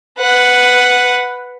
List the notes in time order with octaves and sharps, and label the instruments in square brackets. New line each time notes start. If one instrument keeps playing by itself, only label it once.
[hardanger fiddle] B4 F#5